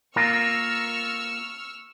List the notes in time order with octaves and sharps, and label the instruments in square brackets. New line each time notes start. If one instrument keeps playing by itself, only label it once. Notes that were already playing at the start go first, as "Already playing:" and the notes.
[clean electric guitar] A#3 F4 A#4 [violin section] C#6 E6 F6